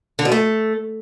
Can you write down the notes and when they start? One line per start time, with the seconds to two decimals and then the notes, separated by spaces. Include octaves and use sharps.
0.19 D3
0.25 B2
0.32 A3